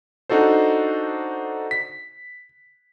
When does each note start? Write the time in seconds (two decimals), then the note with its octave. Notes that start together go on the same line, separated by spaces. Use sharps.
0.29 D4 D#4 F#4 A4 C5
1.71 B6